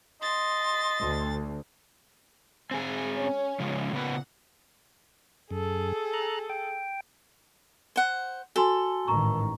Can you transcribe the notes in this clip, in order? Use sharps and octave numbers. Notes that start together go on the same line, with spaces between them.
D#5 C6 A6
D2
G#3 C4 G#4 G#5
C#4
C#3 F3 G#3
A#2 C#3 B3 B4 F#5
F#2 G#4 A4
A#5 F#6
G5
C5 F#5
F#4 A4 G#5 C6
A1 G#2 D#3 A#5 C#6